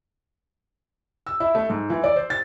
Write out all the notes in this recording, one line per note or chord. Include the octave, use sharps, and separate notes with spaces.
E6
E4
A3
G#2
E3
D5
C5
A6